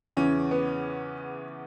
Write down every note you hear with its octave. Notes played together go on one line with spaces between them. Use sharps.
E2 C#3 E3 C#4
B3